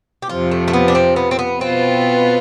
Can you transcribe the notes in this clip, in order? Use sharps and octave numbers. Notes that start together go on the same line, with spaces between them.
G4
F2 C3 F3 F4
A3
A3
B3
D4
C4
B3
C4
B3
B2 B3 C4 F4 B4